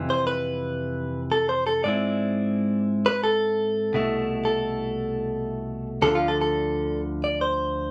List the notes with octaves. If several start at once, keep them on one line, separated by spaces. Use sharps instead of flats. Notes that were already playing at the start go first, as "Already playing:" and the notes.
Already playing: F2 C3 E3
C5
B4
A4
C5
A4
G#2 G#3 C4 E4 D5
B4
A4
C2 B2 A3 E4
A4
D2 D3 F3 A4
F4
A4
A4
D5
C5